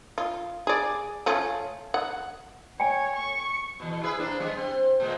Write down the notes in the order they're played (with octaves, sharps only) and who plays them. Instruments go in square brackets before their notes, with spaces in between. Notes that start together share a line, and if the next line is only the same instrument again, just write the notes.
[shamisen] F4
G#4 D5
A3 C#4 F4
F#5
[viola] C#5 [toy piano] G5 G#5
[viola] C#6
[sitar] E2 B2
E4 G#4 B4
A#3 C4 D4
G3 G#3 B3
C4
A#2 G#3 A#3